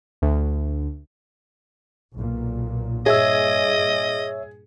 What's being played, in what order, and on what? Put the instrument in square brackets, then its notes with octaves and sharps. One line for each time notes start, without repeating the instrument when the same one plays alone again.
[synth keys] D2
[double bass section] B1 A#2
[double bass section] G2 A#2 [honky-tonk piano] G#4 [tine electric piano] C#5 E5 E6 [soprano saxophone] D#5